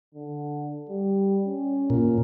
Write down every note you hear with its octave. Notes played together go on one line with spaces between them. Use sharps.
D3
G3
C#4
A#2